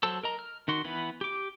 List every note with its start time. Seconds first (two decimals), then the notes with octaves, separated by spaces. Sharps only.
0.03 F#3 A4 C5 A5 E6
0.23 A#4 D#5 A#5
0.39 F6
0.68 D#3 F#4 C6
0.85 E3 B3 B4
1.21 G4 D6